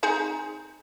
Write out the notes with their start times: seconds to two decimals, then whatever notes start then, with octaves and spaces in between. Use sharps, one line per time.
0.03 C4 D#4 G#4